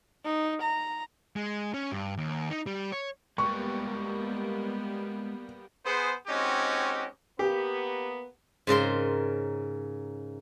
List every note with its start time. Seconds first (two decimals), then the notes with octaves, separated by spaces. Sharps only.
0.25 D#4
0.62 A#5
1.36 G#3
1.74 C#4
1.92 G2
2.17 D#2
2.50 D#4
2.66 G3
2.92 C#5
3.38 G3 G#3 A#3 B3 B4 G5 C#6
5.86 B3 G#4 C5
6.27 G#3 C4 C#4 D#4 F#4 G4
7.39 A#3 B3 G4
8.67 G#2 C#3 A#4 C6